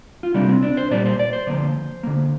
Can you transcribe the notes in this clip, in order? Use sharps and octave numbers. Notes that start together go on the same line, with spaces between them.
F4
C3 G3 A#3 D4
C4
D4
C5
A#2 G3 A#3 D5
C5
D5
C5
D3 F3 A#3
D3 A#3